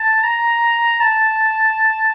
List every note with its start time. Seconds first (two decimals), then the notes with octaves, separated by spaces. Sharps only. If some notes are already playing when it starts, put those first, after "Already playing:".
Already playing: A5
0.23 A#5
1.00 A5